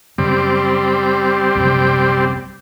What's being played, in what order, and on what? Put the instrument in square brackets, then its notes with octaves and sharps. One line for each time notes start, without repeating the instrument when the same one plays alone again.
[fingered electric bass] F#2 C#3 [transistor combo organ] G3 C4
[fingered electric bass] A#1 F#2 C3